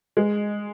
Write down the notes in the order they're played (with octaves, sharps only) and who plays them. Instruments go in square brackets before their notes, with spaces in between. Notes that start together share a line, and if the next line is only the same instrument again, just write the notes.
[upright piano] G#3